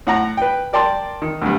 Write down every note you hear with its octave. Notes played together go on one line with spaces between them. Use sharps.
A2 F#5 A#5
B4 G5
A#4 D5 G5 A5 C6
D#3
D2 G2